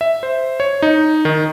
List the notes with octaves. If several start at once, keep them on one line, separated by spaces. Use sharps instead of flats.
E5
C5
C#5
D#4
D#3